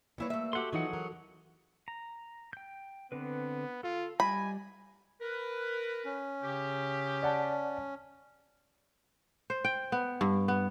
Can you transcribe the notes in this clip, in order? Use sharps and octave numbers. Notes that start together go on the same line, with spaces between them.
G3 A#3 B3 E4 B4 C#5
A3 E5
F#4 G4 A4 F#5 C6
E3 F#3 D#4 F4 G#4 F#5
A#4
A#5
G5 G6
D3 B3 C4 B4
F4 A4
G3 D#5 G#5 B5
A#4 B4
C#4
C#3 G4
D5 F#5 A5
C5
G5
B3
G2
B3